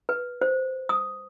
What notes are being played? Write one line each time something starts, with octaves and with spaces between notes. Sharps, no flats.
B4
C5
D#6